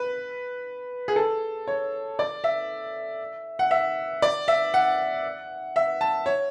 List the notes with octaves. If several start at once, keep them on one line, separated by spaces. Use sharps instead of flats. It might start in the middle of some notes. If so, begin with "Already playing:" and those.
Already playing: B4
G#4
A4
C#5
D5
E5
F#5
E5
D5
E5
F#5
E5
A5
C#5